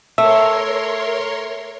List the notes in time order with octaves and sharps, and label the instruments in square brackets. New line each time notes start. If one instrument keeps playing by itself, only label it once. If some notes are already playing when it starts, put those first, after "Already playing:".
[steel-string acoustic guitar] A3 [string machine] A#4 C#5 C6 [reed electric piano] E5